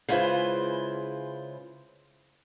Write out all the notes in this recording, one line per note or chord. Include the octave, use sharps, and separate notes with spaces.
C#3 G#3 E4 F4 B4 C5